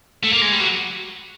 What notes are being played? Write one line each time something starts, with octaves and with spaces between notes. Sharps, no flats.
A3
A#3
G#3
G3
F#3